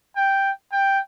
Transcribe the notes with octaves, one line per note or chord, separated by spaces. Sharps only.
G5
G5